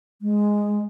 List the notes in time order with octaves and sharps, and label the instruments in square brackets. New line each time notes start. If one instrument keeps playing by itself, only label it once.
[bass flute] G#3